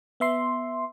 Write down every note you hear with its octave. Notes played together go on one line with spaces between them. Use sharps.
B3 E5 C6